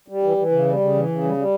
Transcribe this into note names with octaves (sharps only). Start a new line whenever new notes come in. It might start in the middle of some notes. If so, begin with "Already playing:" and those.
G3
E3
E3
C#3
G3
C#3
E3
C#3
G3
G3